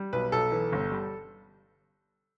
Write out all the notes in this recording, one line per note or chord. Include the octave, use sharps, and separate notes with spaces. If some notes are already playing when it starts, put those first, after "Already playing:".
Already playing: G3
B1 B4
B1 A4
E3
G1
G3